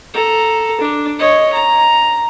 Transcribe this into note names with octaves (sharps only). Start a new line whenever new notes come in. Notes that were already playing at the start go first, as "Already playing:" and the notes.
A4 A#5
D4
C#5 D#5
A#5